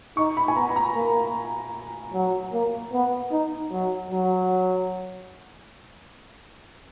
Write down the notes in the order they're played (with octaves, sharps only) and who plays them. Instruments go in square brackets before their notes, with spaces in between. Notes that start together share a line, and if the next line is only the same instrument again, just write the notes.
[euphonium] D#4 [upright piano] C#6
[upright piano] B5
G#5
[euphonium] B3 [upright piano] A#5
[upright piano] B5
A#5
[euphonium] A#3
F#3
A#3
B3
D#4
F#3
F#3